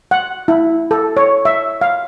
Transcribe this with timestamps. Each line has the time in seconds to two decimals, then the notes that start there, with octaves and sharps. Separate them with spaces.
0.11 F#5
0.48 E4
0.91 A4
1.17 C#5
1.45 E5
1.81 F5